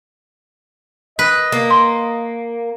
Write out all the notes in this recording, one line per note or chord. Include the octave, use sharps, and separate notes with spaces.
B4 D#5
A#3
C6